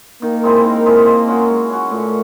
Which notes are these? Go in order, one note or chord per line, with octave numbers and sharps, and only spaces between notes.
D#3 A#3
G#3 C4 E4
D#3
G#3 C4 E4
G#3
C#4 F#4
G#3
C#4 F#4
A#2 A3